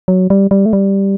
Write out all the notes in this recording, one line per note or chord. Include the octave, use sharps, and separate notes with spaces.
F#3
G3
G3
A3
G3